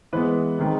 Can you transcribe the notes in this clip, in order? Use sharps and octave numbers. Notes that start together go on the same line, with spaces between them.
E3 G#3 B3 B4
C3 D#3 G#3